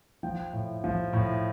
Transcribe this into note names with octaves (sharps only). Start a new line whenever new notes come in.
F3 G5
A2
F3
A2